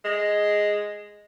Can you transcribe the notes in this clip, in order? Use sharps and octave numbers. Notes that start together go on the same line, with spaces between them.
G#3